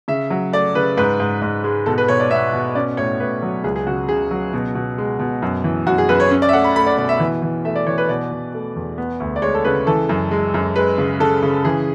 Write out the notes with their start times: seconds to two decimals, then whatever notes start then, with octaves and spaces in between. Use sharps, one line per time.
0.08 C#3 E5
0.30 F#3
0.53 A3 D5
0.75 C#3 B4
0.97 G#2 B4
1.20 G#2
1.42 G#2
1.64 G#3
1.86 B2 A4
1.98 B4
2.08 B2 C#5
2.20 D5
2.31 B3 E5
2.53 B2
2.75 C#4 D5
2.97 A2 C#5
3.20 A2 B4
3.42 F#3
3.64 C#2 G#4
3.76 G#4
3.87 C#3 F#4
4.09 C#3 G#4
4.31 F#3
4.53 B2
4.75 B2
4.98 G#3
5.19 B2
5.42 F#2
5.64 E3
5.86 F#2 F#4
5.98 G#4
6.09 F#2 B4
6.20 C#5
6.31 C#4
6.42 D5
6.49 E5
6.53 A3 F#5
6.64 B5
6.76 A3 B5
6.87 D5
6.97 B2 D5
7.09 E5
7.20 E3
7.42 E3
7.65 A3 E5
7.76 D5
7.87 E3 C#5
7.98 B4
8.09 B2 D5
8.31 B2
8.54 A3
8.76 E2
8.98 B3
9.20 D2
9.36 D5
9.42 G#3 C#5
9.54 A4
9.65 C#3 B4
9.87 E3 A4
10.09 F#2
10.31 G#3
10.54 F#2
10.76 G#3 B4
10.98 C#3
11.20 C#3 A4
11.43 C#3
11.65 E3 G#4